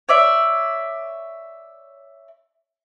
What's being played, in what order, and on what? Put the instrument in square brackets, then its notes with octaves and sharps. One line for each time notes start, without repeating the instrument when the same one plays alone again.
[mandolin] C#5 D5 E5